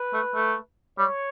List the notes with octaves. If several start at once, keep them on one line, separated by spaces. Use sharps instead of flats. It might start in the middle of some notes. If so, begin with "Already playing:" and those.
Already playing: B4
A3
A3
G3 C#5